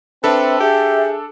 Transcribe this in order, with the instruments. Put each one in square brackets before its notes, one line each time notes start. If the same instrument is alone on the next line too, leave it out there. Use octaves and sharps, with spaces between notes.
[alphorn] C4 [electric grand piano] D4 A4 [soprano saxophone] B4 [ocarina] E5
[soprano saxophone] G4 [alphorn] G#4 [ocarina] E5